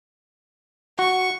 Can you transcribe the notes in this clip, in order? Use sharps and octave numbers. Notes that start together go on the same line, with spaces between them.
F#4 C#6